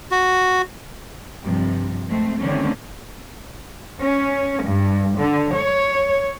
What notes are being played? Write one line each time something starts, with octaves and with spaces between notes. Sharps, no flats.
F#4
G2 C3 F3
G#3 A3 C4
D3 D#3 G3 A3 C4 C#4
C#4
G2
D3
C#5